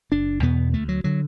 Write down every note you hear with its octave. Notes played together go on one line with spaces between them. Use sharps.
F#1 D4
E2 B2 B3
D2 A3
F#3
D3 F#3